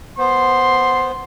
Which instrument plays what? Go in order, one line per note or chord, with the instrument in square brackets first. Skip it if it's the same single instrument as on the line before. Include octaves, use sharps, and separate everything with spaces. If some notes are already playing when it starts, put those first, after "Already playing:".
[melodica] B3 C5 [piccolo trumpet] C6